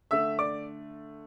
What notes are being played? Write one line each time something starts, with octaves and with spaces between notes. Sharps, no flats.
D3 A3 E5 E6
D5 D6